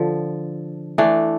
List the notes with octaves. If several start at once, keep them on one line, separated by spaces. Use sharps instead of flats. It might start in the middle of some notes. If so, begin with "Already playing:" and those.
Already playing: D3 F3
E3 A3 D4